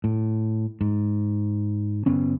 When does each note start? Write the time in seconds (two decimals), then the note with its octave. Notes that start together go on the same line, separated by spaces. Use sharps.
0.04 A2
0.81 G#2
2.06 F#1 B3 C#4